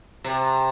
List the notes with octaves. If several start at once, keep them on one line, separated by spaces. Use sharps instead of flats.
C3